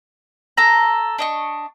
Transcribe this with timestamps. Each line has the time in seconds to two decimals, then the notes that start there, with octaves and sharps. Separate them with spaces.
0.57 A4 A#5
1.19 D4 D#5 C#6